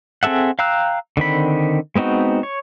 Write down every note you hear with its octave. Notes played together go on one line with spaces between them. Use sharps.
C4 G#4 A4 E5 F#5
F5 G5 A#5 E6 F#6
D3 D#3 C4 B5
G#3 B3 C4 D#4 F#4
C#5